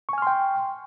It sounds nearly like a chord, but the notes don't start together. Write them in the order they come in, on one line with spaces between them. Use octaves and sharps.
C#6 G#5 F6 C6 G5